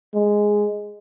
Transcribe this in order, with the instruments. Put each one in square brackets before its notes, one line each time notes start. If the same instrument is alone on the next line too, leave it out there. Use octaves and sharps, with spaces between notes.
[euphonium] G#3